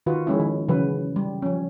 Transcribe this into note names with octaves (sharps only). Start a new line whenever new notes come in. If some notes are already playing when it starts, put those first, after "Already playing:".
D#3 F4 F#4 B4
F3 G#3 C#4 E4
D#3
C#3 E3 F#3 B4
G3
F3 C#4